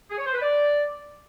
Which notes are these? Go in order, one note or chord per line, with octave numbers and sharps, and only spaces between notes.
G#4
C#5
C5
B4
D5